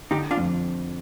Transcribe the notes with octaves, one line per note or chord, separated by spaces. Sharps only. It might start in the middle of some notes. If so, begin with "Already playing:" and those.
D3 D#4 G4
D4 F4
F2